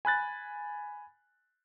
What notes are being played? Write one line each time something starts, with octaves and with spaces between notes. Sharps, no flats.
G#5 B5 F#6 A6